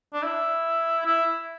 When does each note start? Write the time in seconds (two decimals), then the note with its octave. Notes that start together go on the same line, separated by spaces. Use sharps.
0.13 D4
0.23 E4
1.05 E4